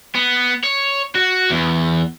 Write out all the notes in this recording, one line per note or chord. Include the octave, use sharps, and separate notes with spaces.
B3
C#5
F#4
E2